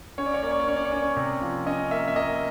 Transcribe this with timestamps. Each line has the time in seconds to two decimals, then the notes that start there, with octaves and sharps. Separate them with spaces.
0.18 C#4 C#5
0.26 D5
0.34 C#5
0.43 A#3 D5
0.51 C#5
0.60 D5
0.68 C#4 C#5
0.76 D5
0.85 C#5
0.92 C#4 D5
1.02 C#5
1.16 C3
1.41 F3
1.66 C#4 D#5
1.91 A#3 E5
2.08 E5
2.16 A#3 D#5